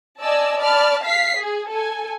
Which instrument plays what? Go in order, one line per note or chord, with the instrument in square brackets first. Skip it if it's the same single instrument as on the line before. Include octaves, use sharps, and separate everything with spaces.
[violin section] D5 D#5 G#5 A5 E6
D5 A5 B5 F6
F5 B6 C7
G#4
A4 G#5